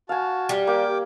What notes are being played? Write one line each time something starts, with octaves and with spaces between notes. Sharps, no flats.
F#4 F5 G#5 A5
G3
A#3 G5 D6